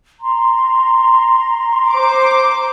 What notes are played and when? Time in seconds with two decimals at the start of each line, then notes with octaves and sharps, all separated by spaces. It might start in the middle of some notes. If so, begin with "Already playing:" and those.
0.20 A#5 C6
1.92 C5 D6